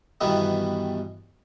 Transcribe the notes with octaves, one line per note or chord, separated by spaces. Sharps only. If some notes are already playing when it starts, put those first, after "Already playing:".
G2 B2 D#3 E3 G3 B3